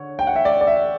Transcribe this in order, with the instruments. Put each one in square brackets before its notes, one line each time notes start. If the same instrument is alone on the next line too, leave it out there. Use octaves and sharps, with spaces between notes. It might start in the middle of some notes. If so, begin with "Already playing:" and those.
Already playing: [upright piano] D3 C#5
G5
F#5
E5
D5
D5
E5